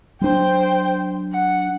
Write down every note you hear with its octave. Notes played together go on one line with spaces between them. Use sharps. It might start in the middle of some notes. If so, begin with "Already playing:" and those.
F#3 D4 C5 G5
F#5